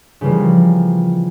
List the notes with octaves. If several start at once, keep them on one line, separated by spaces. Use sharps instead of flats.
C#3 E3 F3 G3 A#3